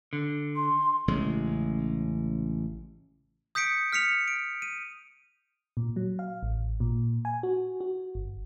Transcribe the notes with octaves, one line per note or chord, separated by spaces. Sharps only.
D3
C6
A1 C#3 G#3
D#6 G6 B6 C#7 D7
F6 B6 C#7 F7
D7
D#7
A#2
F#3
F5
A1
A#2
G#5
F#4
F#4
G1